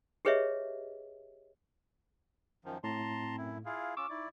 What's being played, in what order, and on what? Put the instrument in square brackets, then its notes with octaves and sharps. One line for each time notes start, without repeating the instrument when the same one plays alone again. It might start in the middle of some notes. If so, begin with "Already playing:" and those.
[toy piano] G4 G#4 B4 C#5 D#5 E5
[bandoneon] F#2 D#3 F3
[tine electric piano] A2 [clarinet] C4 [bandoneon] A5 A#5 C6
[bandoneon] F#2 E4
[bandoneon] E4 F4 G#4 [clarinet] F5
[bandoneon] C#4 F4 [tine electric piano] C#6 D6 [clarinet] E6
[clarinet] D#4 [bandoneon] E4 D5